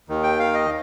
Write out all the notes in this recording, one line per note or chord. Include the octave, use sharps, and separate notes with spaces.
D#2 D#3
G5
F5
D#5